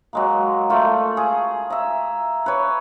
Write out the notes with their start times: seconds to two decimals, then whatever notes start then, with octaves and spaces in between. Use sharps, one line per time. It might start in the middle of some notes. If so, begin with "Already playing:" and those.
0.13 F#3 G#3 A#3
0.70 A3 F4 A4
1.17 G#4
1.70 E5 A#5
2.46 B4 C#5